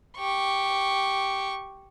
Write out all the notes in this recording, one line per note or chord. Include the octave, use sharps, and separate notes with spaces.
G4 C#6